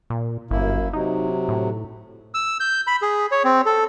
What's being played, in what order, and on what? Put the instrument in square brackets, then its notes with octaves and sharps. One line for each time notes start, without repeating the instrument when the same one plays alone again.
[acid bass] A#2
[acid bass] G1 [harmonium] F#2 A#3 E4
[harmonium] C3 F#3 [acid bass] D#4
[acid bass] A2
[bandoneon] E6
G6
B5
G#4
C#5
C4
A4